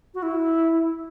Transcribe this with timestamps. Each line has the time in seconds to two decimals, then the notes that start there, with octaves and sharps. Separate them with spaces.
0.14 F#4
0.22 E4